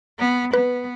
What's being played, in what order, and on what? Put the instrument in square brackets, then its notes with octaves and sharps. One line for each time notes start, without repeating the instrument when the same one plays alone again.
[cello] B3
[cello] B3 [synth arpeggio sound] B4